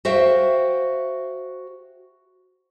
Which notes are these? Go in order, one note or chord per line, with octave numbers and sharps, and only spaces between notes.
F#4 C5 E5 F5 G5